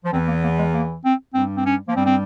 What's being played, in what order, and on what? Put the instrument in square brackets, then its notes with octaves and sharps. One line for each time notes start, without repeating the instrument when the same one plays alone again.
[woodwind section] F3
[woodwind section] E2 E3 [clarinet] C4
[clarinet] A#3
A#3
G#3
A#3
C4
[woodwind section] G2 G3 [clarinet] C4
[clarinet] C4
C#4
[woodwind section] F3 [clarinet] A#3
[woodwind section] G2 G3 [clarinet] C4
[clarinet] C4